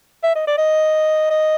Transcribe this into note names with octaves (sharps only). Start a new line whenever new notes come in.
E5
D#5
D5
D#5
D#5